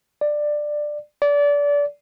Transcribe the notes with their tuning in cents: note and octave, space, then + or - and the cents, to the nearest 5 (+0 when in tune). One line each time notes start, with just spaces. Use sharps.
D5 +15
D5 -25